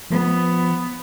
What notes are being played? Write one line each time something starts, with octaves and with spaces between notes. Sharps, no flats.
F3 B3